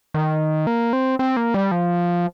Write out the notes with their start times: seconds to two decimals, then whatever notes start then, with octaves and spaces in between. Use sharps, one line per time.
0.14 D#3
0.67 A#3
0.93 C4
1.19 C4
1.37 A#3
1.54 G3
1.72 F3